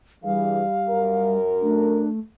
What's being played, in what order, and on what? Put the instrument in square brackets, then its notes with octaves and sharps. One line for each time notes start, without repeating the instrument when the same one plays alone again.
[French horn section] G2 E3 G#4 [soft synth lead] G3 [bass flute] F5
[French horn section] F#2 A#4
[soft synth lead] A3 [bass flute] D4